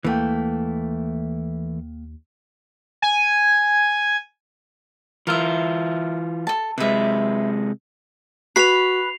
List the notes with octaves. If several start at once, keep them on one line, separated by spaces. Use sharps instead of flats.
D#2 E3 A3 A#3 G5
G#5
E3 F4 A#4 E5
A4 A5
C3 G#3 B4 E5
F#4 B4 B5 C7 F7